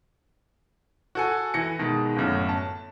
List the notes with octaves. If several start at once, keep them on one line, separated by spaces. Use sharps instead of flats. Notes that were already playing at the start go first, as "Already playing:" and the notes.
F#4 A4 G#5
E3 A#6 C#7
B2 D#3 G#3
G1 F#2 A2
A5